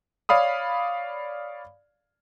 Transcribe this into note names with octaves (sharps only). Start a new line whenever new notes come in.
C#5 D5 F5 B5 D#6